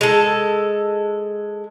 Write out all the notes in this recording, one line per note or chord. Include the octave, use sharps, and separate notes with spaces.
G#3 A4